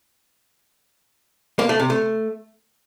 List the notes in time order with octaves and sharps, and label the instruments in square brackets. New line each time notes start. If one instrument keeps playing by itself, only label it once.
[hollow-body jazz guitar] A#3
A3
C3
A3